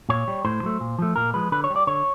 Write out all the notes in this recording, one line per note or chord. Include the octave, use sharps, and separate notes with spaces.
A#2 C#5
G3
A2 C5
F#3 A3
A#2
F3 A3
A#2 A#4
F3 G#3 B4
D3 B4
C#5
G3
D5
D3 C#5